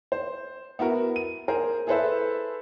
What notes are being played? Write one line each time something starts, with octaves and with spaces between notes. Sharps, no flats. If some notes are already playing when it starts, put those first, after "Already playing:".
C5
B3 E4 F#4 A#4
D#7
G#4 A#4 C5
E4 G#4 A4 B4 C5 E5